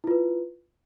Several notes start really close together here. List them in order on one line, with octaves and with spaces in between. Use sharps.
E4 F4 B4